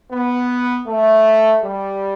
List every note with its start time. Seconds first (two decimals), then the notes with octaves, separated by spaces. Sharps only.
0.11 B3
0.87 A3
1.63 G3